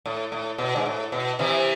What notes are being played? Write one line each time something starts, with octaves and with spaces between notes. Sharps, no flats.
A2
A2
B2
G#2
A2
B2
C3 E3